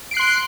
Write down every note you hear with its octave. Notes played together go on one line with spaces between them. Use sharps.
C6 F#6 C7 D7